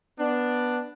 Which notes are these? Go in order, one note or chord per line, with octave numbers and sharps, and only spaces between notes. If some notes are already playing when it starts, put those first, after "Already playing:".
B3 D4